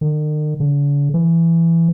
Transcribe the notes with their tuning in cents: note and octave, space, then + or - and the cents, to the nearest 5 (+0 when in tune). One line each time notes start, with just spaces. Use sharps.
D#3 -45
D3 -45
E3 +15